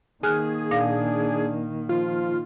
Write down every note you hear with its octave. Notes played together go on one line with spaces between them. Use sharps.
D#3 A#3 G#4 G#5 F6 F#6
A#2 D4 F5 A#6
F3 F4